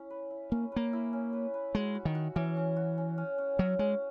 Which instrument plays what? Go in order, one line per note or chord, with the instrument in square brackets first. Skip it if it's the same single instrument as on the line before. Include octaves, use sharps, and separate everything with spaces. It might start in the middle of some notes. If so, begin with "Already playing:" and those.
Already playing: [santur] C#4 E4
B4
E4
[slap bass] A#3 [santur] C#4
[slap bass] A#3 [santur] B4
[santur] E4
C#4
B4
B4
[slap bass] G#3 [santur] F#4
[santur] F#4
[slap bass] D#3
[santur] F#4
[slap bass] E3 [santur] C#4
[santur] C#4
F#4
C#4
C#4
C#4
[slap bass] F#3 [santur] C#4
[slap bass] G#3 [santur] C#4